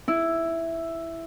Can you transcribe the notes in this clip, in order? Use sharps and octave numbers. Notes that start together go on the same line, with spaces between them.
E4